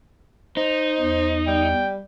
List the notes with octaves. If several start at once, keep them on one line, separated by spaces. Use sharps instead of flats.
D#4 C5
E2
G3 G5